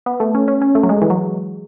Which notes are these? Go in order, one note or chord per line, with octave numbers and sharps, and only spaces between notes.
B3
A3
C#4
C#4
C#4
A3
F#3
G#3
E3
F#3